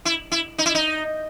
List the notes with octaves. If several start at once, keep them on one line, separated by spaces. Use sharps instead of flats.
E4
E4
D#4
E4
D#4